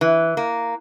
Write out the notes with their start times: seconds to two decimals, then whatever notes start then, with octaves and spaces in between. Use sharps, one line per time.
0.01 E3
0.37 A#3